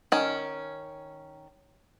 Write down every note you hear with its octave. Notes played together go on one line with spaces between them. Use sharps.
D#3 C#4